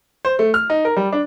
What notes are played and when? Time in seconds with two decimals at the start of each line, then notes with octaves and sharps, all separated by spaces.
0.25 C5
0.39 A3
0.54 F6
0.70 D#4
0.85 A#4
0.96 G3
1.12 D4